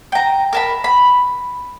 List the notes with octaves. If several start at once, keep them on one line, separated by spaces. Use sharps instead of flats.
G5 A#5
A#4 A5 B5
B5